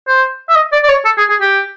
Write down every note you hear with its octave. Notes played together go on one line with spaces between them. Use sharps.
C5
E5
D#5
D5
D5
C#5
A4
G#4
G#4
G4